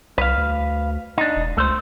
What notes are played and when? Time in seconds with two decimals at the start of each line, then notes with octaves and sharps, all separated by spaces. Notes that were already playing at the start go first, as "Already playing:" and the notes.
0.18 C2 B4 F5
0.38 D2
1.18 D4 D#4
1.36 E1
1.57 C#2 A3 C5